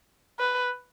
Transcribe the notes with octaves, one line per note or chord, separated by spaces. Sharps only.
B4